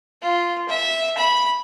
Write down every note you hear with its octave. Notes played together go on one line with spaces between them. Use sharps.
F4
E5
B5